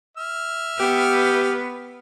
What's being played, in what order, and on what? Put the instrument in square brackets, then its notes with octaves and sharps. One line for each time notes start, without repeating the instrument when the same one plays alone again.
[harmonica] E5 F6
[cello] B3 B4 [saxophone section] G4